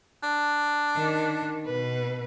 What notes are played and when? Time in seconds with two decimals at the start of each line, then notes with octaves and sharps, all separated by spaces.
0.23 D4
0.96 D#3
1.65 B2 B4